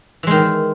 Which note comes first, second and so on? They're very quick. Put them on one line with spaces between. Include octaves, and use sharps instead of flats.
E3 G#3 D#3